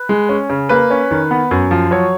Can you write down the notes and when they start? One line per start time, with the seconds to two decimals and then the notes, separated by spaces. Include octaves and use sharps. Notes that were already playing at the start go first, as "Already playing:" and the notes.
Already playing: B4
0.09 G#3
0.29 C#4
0.50 C#3
0.69 A#3 B4
0.91 C#4
1.11 D#3
1.31 B3
1.51 F#2
1.71 F3
1.91 F#3 C#5